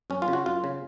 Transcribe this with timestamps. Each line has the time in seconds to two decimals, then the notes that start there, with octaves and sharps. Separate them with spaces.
0.10 F#2 C#4
0.22 F4
0.28 C#3
0.33 F#4
0.46 F#2 F4
0.64 C#3